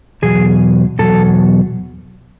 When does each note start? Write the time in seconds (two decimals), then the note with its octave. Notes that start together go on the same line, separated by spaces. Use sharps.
0.22 E2 B2 F#3 G#4
0.99 E2 B2 F#3 A4